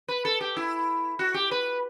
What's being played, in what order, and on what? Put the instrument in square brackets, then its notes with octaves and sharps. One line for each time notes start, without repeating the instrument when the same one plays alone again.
[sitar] B4
A4
G4
E4
F#4
G4
B4